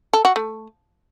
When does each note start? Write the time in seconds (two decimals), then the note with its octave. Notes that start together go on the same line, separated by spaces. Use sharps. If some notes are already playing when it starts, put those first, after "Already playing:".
0.13 A4
0.25 F#4
0.36 A3